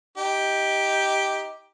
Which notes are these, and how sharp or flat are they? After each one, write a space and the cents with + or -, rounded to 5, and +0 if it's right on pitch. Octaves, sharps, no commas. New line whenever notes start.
D#4 +15 G4 +0